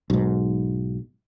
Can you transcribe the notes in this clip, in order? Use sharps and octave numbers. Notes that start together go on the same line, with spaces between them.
B1 G#2